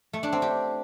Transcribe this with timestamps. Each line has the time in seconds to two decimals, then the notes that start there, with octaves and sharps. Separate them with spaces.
0.13 A3
0.23 D4
0.32 C4
0.42 G4